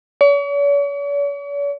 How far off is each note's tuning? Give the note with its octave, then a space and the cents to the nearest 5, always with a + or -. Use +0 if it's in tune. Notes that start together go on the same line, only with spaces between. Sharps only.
C#5 +45